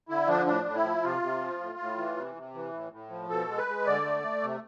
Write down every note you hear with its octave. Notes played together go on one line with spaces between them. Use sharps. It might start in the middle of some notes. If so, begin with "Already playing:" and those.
D3 E4
F3 D4
A2 D4
A2
E4
F3
C3 F4
C3
F3
A2
A2
E3
C3
C3
E3
A2
A2
F3
B2 A4
G#3
B4
G#3
D3 D5
A3
A3
C3